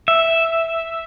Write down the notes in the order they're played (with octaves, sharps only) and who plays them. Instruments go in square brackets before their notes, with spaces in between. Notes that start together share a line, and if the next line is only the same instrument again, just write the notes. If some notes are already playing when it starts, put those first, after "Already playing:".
[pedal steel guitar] E5